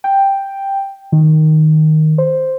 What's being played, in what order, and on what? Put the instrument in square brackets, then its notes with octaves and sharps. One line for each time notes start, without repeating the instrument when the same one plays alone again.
[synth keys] G5
D#3
C5